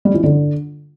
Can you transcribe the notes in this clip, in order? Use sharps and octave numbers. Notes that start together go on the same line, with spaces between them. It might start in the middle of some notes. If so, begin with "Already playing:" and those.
G3
E3
D3